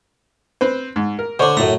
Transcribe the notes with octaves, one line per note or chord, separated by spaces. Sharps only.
C4 B4 C5
G#2
A#4
D3 D4 C5 C#5
F#2 A2 A3 A#5